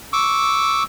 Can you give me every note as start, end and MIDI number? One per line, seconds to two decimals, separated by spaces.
0.13 0.83 85
0.13 0.83 86
0.13 0.83 88